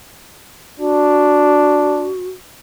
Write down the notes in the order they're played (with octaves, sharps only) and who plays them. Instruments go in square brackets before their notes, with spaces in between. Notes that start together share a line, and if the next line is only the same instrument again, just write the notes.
[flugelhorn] D4 [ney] F#4